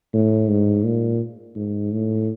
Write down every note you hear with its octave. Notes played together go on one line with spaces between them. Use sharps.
A2
G#2
A#2
G#2
A2